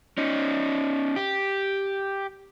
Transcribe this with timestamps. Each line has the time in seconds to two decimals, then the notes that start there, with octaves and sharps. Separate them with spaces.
0.18 C#4 D#4
1.16 G4